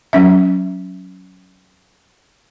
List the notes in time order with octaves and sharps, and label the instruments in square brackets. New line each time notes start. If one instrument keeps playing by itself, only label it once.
[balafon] F#3 C#4 E5